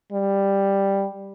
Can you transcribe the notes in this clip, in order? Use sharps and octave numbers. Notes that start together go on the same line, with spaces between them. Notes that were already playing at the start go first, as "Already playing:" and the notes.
G3